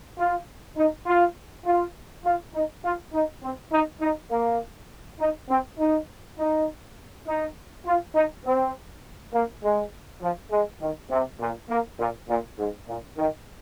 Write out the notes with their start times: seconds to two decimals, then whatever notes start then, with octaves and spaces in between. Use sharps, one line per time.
0.18 F4
0.77 D#4
1.07 F4
1.65 F4
2.25 F4
2.54 D#4
2.84 F4
3.13 D#4
3.43 C4
3.72 D#4
4.02 D#4
4.32 A#3
5.20 D#4
5.49 C4
5.79 D#4
6.38 D#4
7.27 D#4
7.86 F4
8.15 D#4
8.45 C4
9.34 A#3
9.63 G#3
10.22 F3
10.51 G#3
10.81 D#3
11.11 C3
11.40 A#2
11.70 A#3
11.99 A#2
12.29 A#2
12.58 G#2
12.88 A#2
13.17 D#3